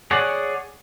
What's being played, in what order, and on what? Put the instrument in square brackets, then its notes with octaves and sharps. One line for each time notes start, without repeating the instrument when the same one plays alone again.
[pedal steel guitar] G#4 C#5 D5 F#5